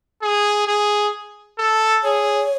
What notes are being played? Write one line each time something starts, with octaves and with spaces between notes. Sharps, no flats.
G#4
G#4
A4
G#4 C#5